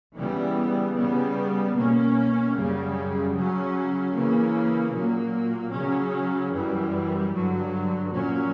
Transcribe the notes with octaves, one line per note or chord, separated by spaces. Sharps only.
C#3 E3 G3 B3
C#3 G3 B3
B2 A#3 C#4
F#2 C#3 G3
C#3 F#3 C#4
C#3 E3 A#3 C#4
A#2 F#3 A#3
C#3 F#3 C#4
F#2 E3 G3
G2 D3 F#3
A#2 F#3 A#3 C#4